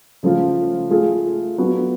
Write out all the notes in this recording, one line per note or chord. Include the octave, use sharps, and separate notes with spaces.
C#3 F3 A3 F4
A3 F4 G#4
F#3 B3 D4 F#4 A4